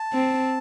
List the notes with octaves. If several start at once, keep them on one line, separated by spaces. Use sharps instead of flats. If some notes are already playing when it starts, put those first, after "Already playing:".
Already playing: A5
C4